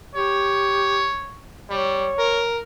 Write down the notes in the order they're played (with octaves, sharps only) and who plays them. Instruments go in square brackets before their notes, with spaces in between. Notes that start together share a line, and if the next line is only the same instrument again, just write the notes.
[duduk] G4 [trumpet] C#5
[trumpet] G3 [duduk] C#5
[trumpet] A#4